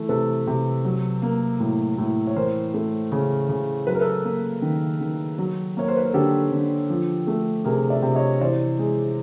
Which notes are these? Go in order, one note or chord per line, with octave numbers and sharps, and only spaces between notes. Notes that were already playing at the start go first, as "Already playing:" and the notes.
Already playing: E3 A3
C3 A4 B4
C3
F#3
A#3
A2
A2
C#5
E3 A#4 C5
A3
C#3
C#3
F#3 B4
A#4
A4 B4
A#3
D#3
D#3
F#3
A#3 C#5
C5
B4
A#4
D3 G4 A4
D3
F3
A3
C3 G#4 A#4
D5 E5
C3
C#5 D#5
E3 C5 D5
G#3